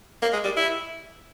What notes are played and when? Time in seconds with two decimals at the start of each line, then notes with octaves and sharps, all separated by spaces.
0.22 A#3
0.33 G#3
0.44 G3
0.57 E4